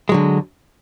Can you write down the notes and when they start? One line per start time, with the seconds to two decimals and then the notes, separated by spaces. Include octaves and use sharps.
0.09 G#3
0.12 F#3
0.14 D3